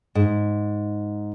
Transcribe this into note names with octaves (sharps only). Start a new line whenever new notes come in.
G#2